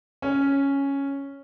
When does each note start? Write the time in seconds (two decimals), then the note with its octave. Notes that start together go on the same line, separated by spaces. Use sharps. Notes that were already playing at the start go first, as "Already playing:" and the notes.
0.22 C#4